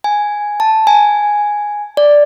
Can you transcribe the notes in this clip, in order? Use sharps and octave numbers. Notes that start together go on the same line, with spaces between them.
G#5
A5
G#5
D5